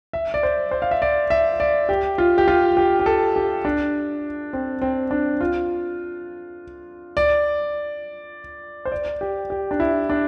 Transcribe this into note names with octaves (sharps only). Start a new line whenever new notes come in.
E5
D5
C5
C5
F5
E5
D5
E5
D5
G4
F4
G4
F4
G4
G4
A4
G4
D4
C4
C4
D4
F4
D5
C5
D5
G4
G4
D4
E4
D4